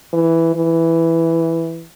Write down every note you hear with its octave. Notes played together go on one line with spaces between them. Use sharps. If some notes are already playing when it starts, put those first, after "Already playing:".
E3
E3